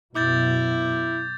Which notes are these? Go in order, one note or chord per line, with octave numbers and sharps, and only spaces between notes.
F#2 B2 E4 D6 G6 A6